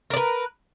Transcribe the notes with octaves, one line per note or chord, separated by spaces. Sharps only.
A#4 B4 D5